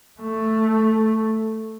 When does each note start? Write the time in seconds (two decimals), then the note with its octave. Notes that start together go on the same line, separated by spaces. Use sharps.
0.20 A3